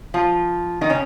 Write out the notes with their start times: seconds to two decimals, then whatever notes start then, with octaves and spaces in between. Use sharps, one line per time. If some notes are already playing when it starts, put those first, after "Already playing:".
0.14 F3 F4
0.81 D#3 D#4
0.89 C#3 C#4